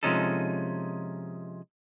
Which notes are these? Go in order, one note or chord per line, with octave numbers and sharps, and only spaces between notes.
C3 F3 G#3 C#4 D#4 A4